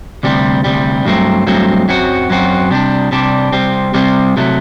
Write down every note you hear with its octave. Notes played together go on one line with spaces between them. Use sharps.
D2 C3 G3
D2 C3 G3
G2 F#3 A3 C4
G2 F#3 A3 C4
F#2 F#3 C4 F#4
F#2 F#3 C4 F#4
C3 G3 D4
C3 G3 D4
C3 G3 C4
C3 G3 C4
C3 F#3 A3